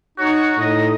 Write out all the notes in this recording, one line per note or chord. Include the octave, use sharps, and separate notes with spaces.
D#4 F#4 C#5
A2 D#4 D#5